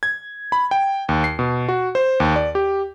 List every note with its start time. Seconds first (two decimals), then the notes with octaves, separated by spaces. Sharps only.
0.03 G#6
0.52 B5
0.71 G5
1.09 D#2
1.24 C7
1.39 B2
1.68 F#4
1.95 C5
2.20 D#2
2.36 D5
2.55 G4